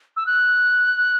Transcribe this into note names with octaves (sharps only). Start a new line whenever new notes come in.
E6
F#6